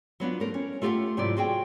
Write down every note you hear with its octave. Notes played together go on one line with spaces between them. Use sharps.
F#3 B3 D4 F4
A3 A#4 C5
C#4
A3 F4 G4 A#4 F5 F#5
G#2 C3 F#3 E4 F4 D5
F4 F#4 G#4 G5